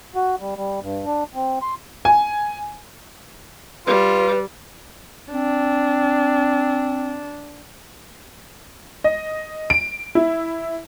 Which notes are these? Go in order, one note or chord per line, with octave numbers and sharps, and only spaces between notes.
F#4
G3
G3
G2
D4
C4
C6
G#5
G3 F4 B4
C4 D4
D#5
D7
E4